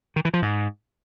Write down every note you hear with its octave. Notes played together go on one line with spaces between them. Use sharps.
D#3
E3
F3
G#2